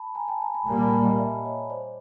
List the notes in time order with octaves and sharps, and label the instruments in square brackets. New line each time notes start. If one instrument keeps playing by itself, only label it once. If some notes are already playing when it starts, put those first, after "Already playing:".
Already playing: [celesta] A5 B5
G#5 A#5
G5 A5
G#5 A#5
A5 B5
[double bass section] A#2 G3 A#3 [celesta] G#5 A#5
[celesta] A5 B5
G#5 A#5
D#5 F5
D5 E5
C#5 D#5
C5 D5